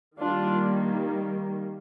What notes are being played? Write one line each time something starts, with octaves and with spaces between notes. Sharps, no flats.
D#3 G3 A#3 D4 F4